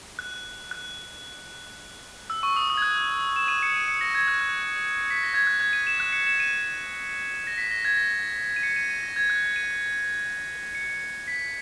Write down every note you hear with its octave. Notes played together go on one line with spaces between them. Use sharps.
F#6
F#6
E6
C#6
D#6
D#6
G#6
F#6
E7
D#7
C#7
D#7
C#7
A#6
G#6
F#6
F#6
C#7
B6
A#6
G#6
F#6
G#6
D#7
E7
F#6
C#7
E7
D#7
A#6
B6
A#6
G#6
A#6
D#7
C#7
D#7
D#7
A#6
G#6
F#6
D#7
C#7
B6